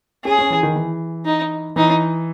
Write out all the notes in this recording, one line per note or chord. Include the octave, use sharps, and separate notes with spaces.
C#4 G#4
C#4
E3
D#3
E3
D#4
E3 D#4